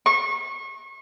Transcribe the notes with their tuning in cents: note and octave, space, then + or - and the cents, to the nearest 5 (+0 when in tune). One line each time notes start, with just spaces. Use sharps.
C#6 -35